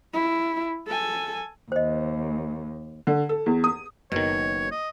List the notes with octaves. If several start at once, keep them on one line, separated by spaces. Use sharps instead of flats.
E4
A4 G#5
D#2 C5 D#5
D3
A4
E2
D#6
F#1 B2 D#3 C#5
D#5